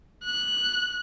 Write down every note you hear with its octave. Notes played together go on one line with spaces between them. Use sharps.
F#6